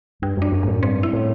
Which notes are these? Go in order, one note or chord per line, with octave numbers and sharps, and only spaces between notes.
G2 G3
F#2 D4
F#2
F#2 A2
G2 C4
E4
A2